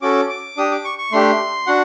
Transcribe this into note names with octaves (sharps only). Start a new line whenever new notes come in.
C#4 F#4 A4 D6
D6
D4 G4 D#6
D6
C#6
C#6
A3 D4 G4 C6
D4 F#4 F#5